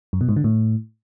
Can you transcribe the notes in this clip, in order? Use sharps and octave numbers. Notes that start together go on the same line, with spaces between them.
F#2
B2
G#2
D3
A2